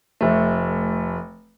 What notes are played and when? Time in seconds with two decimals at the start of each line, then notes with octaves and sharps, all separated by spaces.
0.21 F1 A3